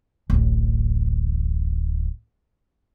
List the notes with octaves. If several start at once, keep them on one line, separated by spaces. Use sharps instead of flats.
D1 A1